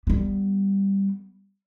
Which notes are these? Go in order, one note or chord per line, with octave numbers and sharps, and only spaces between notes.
G3 B3